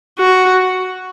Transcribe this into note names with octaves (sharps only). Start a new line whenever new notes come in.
F#4